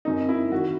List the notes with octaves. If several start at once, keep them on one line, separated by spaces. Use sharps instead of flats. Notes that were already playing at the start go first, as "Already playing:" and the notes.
F#2 F#3 C4 D#4
E4
D#3 F#3 F#4